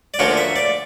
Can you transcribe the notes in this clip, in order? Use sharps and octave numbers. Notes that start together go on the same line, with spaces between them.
D5
D2 D3 F3 A#3 C#4 C#5
E5
D5